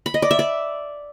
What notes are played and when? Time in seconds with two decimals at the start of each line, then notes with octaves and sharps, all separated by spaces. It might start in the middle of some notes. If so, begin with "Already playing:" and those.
0.06 B5
0.14 D#5
0.22 D5
0.31 E5
0.39 D5